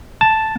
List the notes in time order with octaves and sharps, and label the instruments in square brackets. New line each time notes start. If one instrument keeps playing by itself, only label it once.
[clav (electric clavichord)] A5